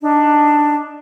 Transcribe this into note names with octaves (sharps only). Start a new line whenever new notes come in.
D4 D#4